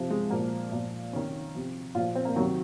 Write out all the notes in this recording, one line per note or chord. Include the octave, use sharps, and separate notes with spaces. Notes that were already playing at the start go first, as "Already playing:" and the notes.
Already playing: C3 F3
G#3
A#2 F3 A#3
A#2 F3
C3 D#3 C#4
C3 F3
A#2 F3 F4
C4
A#3
C3 D#3 F#3